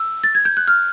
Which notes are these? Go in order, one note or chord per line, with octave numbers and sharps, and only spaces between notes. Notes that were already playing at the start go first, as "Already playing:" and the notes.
Already playing: E6
A6
G#6
G6
F#6
F6